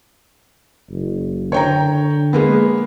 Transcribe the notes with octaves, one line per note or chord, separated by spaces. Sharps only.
F#1
D3 C#5 G5 A#5
G#3 A#3 B3